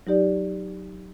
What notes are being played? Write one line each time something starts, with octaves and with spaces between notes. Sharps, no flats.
F#3 D#4 G4 D5